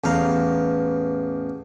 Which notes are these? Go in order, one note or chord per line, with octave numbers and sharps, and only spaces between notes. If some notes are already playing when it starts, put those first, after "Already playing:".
A1 E2 F5 A#5